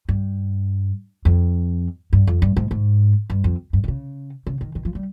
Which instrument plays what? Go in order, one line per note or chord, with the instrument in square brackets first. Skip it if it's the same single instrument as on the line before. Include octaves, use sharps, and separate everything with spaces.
[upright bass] G2
F2
G2
F2
G2
G#2
G#2
G2
F2
G2
D#3
C#3
C#3
D#3
D#3
F3
G3